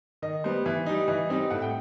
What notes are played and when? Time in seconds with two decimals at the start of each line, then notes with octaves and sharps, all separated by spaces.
0.22 D#3 D#5
0.44 G3 B3 C5
0.66 E3
0.86 G3 D#4
1.08 E3 D#5
1.29 G3 C4 D#4
1.51 A2 F#5
1.62 G5